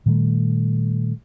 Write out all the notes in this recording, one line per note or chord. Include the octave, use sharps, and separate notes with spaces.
A#2 D#3 G3 A3